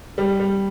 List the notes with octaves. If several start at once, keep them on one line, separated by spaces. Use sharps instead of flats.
G3
G3